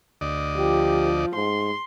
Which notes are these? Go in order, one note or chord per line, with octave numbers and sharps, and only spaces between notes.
D2 D5 D#5
F3 G4
G#2 C6